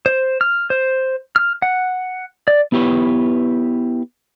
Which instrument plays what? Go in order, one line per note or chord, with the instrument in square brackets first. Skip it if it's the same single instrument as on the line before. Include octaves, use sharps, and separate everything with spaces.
[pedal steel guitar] C5
F6
C5
F6
F#5
D5
[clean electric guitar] B3 E4 G4 B4 C#5